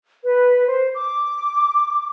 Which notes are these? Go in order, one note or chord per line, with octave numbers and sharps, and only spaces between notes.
B4
C5
D6